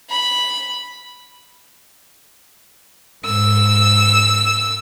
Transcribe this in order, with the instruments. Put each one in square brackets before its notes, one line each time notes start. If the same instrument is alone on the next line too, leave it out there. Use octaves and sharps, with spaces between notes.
[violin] B5
[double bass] G#2 [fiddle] E6